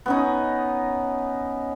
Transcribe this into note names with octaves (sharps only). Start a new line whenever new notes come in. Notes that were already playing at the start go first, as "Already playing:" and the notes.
B3 C#4 D#4